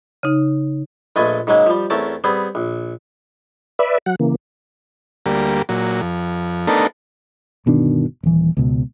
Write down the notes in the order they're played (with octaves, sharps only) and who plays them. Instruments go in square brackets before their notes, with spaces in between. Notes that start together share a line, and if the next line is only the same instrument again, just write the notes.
[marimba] C#3 D#4
[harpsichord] A#1 A3 F4 B4 D#5 G#5
G#2 C#3 F#3 G#3 A#3
F3 G3
E2 A3 C4 C#4 A#4 A5
G3 B3 C4 G#4
A#1
[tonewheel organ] B4 D5 E5
F#3 F#5
C#3 E3 A#3
[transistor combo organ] D2 G3 A#3
A#2 F#3
F2
A3 B3 D4 D#4 A4 A#4
[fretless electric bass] G1 B2 D#3 D4
D#1 E3
C#2 B2